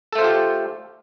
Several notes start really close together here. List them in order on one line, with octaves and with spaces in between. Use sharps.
A4 A3 C5 F4 G4